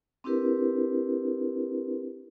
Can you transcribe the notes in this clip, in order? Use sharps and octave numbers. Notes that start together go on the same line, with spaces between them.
C4 D4 E4 G4 A#4 B4